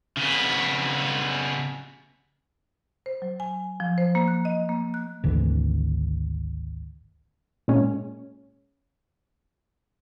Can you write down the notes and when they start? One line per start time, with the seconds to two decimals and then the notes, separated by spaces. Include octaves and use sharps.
0.17 C#3 B3
3.06 C5
3.22 F#3
3.40 G#5
3.80 F3
3.98 C5
4.15 A#3
4.28 F#6
4.45 D#5
4.69 A#3
4.94 F#6
5.24 G#1 D2 D3 E3
7.68 A#2 G#3 C#4